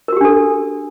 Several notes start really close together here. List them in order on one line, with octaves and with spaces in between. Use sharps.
A#4 F#4 G4 D4 A4